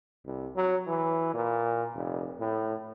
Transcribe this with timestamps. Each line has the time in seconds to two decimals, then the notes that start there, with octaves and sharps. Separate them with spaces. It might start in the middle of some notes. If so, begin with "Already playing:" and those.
0.25 C2
0.56 F#3
0.87 E3
1.34 A#2
1.95 F1
2.40 A2